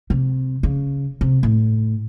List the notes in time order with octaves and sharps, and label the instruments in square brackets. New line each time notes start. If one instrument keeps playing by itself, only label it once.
[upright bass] C3
C#3
C3
A2